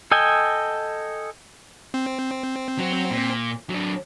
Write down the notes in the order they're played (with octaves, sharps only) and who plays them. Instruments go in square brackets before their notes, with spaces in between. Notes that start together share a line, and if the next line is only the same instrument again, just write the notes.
[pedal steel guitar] A4 D#5 G5 G#5
[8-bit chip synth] C4
[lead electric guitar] F#3
A#2
F#3 D4